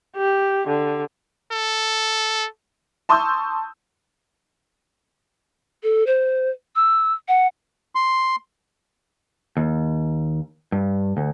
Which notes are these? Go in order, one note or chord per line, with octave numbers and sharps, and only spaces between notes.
G4
D3
A4
A5 C6 C#6 D#6 E6 G6
A4
C5
E6
F#5
C6
D#2
G2
D2